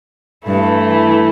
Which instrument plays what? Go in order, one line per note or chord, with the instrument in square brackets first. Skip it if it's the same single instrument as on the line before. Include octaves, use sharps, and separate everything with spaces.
[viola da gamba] G2 [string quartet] E3 A3 E4